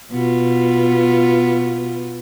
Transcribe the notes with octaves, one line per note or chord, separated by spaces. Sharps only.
B2 B3 F4